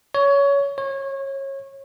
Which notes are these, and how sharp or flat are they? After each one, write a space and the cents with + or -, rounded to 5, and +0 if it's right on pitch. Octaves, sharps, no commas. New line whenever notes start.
C#5 +20
C#5 -25